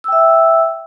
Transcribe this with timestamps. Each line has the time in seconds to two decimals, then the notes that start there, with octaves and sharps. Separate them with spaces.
0.04 E6
0.08 G5
0.12 E5